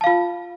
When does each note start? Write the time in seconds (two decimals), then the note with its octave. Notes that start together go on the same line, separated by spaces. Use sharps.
0.01 A5
0.04 F5
0.07 F4